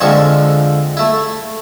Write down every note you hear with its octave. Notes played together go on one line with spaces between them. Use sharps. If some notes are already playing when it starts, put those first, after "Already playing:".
F2 D3 F3 G#3 E5 C#6
A3 E4